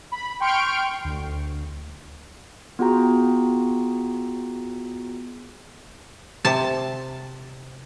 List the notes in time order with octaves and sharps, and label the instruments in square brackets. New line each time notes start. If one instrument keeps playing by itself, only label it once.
[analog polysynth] B5
G5 C6 C#6 F6 D7
D2
[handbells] B3 F4 F#4 G#4 G5 A#5
[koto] C3 A5